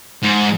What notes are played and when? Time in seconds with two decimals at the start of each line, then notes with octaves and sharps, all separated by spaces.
0.23 G#2